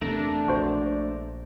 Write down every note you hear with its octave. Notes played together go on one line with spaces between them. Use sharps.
E2 C3 A3 D4 A#4
A#1 F#4 C5